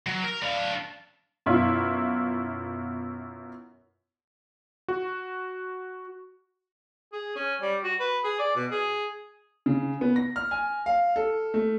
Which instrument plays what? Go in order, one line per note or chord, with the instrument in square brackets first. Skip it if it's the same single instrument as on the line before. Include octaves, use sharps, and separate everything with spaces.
[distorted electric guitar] F#3
A#4
D4 F5
[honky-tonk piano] F#2 B2 E4 F4
[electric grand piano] F#4
[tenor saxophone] G#4
C#4
G3
F#4
B4
G#4
D5
B2
G#4
[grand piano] C#3
B3
A#6
F6
G#5
F5
A4
A3